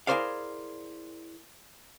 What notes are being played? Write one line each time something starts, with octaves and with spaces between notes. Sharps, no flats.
E4 G#4 A#4 C5 D5 F5